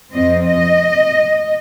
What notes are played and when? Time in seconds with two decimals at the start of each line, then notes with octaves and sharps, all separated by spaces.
0.12 F2 F3 C4 D#5
0.45 D#5